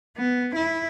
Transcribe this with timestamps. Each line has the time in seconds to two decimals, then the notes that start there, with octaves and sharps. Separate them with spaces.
0.17 B3
0.56 E4